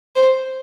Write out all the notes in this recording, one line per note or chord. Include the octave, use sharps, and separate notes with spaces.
C5